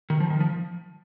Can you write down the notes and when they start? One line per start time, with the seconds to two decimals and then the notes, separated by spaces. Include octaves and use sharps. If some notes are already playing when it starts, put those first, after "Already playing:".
0.10 D#3
0.20 F3
0.30 D#3
0.40 F3